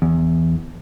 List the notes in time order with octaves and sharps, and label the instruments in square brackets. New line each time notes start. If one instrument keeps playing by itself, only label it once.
[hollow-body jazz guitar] E2